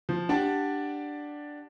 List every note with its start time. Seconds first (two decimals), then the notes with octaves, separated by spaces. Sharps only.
0.09 F3
0.29 D4 G4 D5 F#5 A5